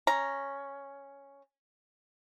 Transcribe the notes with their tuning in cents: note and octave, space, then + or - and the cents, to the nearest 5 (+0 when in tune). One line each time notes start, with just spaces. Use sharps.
C#4 +0 A#5 +0